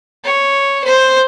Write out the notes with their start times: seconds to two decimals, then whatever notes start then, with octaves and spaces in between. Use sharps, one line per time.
0.24 C#5
0.84 C5